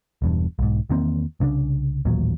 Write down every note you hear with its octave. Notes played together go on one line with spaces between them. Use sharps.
E1 E2 G2
B1 G#2
E2 D#3 A#3 C4
C2 C#3 C4 D4
A1 D#2 A#2 F#3